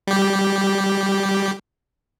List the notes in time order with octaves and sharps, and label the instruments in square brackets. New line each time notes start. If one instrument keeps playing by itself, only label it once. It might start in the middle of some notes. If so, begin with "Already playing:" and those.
[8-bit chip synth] G3 G4